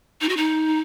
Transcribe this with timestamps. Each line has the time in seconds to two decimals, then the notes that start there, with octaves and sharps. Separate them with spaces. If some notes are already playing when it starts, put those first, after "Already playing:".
0.21 D#4
0.29 F#4
0.37 D#4